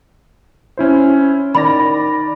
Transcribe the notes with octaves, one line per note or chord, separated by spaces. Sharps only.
C#4 E4 C5
D#3 D5 B5 A#6